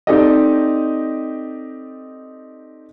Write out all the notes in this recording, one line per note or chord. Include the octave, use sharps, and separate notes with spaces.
C4 D#4 G4 A4 D5 D#5